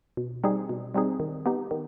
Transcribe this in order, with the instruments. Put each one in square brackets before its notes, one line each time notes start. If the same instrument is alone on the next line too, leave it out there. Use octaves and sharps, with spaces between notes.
[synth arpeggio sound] B2
G3 C4 D#4 G#4
B2
G3 C4 D#4 G#4
D#3
B3 D#4 G4
D#3